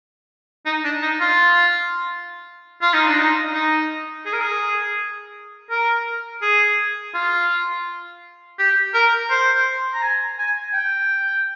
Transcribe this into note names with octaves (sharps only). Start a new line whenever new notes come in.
D#4
D4
D#4
F4
F4
D#4
D4
D#4
D#4
G#4
A#4
G#4
A#4
G#4
F4
G4
A#4
C5
A#5
G#5
G#5
G5